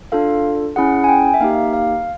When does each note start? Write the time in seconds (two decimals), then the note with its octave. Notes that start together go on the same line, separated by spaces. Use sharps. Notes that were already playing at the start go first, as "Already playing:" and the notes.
0.12 D4 F4 A4 F5
0.76 C#4 E4 G#4 F#5
1.04 G#5
1.09 G5
1.34 E5
1.40 A#3 D#4 G4 F5
1.73 F5